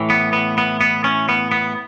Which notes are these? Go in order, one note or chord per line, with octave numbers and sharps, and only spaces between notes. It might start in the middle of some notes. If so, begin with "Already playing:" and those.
Already playing: A2 E3
B3
B3
B3
B3
C#4
B3
B3